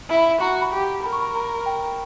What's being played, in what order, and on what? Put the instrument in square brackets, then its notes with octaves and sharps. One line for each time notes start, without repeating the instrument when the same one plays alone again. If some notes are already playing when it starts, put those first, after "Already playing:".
[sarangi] E4 [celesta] B5
[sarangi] F#4 [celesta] A#5
[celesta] B5
[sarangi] G4
[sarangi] A#4 [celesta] B5
[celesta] C#6
B5
A#5
G5